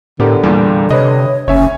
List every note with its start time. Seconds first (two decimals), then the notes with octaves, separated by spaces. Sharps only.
0.20 A2 D3 B3 G4 A#4
0.43 E2 A#2 G3
0.90 C3 B4 C#5 D#5
1.48 F#1 C#4 C#5 E5 G#5